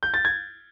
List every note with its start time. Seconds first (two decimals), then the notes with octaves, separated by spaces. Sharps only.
0.03 G6
0.14 A6
0.25 G#6